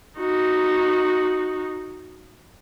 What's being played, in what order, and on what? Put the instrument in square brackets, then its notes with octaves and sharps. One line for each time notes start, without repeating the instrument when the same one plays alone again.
[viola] D#4 F#4